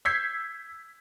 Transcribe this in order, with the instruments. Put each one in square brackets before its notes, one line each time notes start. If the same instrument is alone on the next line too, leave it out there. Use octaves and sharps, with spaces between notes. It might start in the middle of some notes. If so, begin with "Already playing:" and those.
[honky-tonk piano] E6 G6 G#6 B6 C7